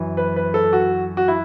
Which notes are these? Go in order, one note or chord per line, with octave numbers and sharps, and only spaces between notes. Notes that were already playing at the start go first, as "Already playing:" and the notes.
Already playing: F#2 E3
B4
B4
A4
F#4
F#4
E4